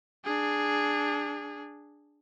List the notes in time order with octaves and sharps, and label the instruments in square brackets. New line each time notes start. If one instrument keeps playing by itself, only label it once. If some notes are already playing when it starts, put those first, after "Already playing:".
[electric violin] D4 G#4